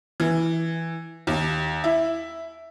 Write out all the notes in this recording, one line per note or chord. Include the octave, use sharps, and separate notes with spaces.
E3
D#2
E4